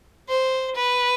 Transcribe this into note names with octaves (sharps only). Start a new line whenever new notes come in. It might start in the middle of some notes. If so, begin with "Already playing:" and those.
C5
B4